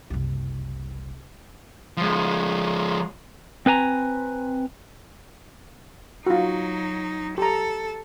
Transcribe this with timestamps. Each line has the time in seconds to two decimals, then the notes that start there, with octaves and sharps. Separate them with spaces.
0.10 F#1 C2
1.97 F3 G#3
3.66 C4 B4 G#5 A#5
6.26 F#3 D#4 F4 F#4
7.38 G4 A4 A#5